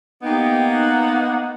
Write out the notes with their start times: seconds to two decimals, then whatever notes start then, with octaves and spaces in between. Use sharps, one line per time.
0.23 A#3 B3 D#4 G4 G5
0.73 F#5